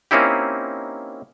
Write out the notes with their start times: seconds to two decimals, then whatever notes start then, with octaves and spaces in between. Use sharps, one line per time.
0.11 A#3 C4 C#4 D#4 E4 G4